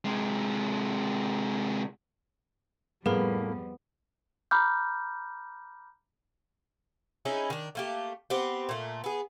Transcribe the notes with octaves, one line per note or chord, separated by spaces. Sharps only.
C3 G#3
F2 A2 G3 A#3 B3 G#4 B4
A#5 B5 D6 F6 G6
C#4 D#4 E4 G#4
D#3 D4
A3 A#3 G4
B3 C4 G4
A#2 A3
B3 G#4